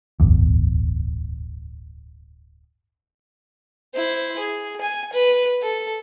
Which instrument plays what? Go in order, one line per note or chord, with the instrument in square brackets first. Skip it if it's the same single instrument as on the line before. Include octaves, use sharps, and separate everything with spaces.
[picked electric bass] D1 G1 E2
[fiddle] E4 C5
G#4
G#5
B4
A4